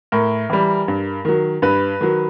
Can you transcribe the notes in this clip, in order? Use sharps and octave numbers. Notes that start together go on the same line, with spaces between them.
A2 A#4
E3 G3
G2
D#3 F#3
G2 B4
D#3 F#3